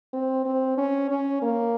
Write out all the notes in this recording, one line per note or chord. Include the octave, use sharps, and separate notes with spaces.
C4
C4
C#4
C#4
A#3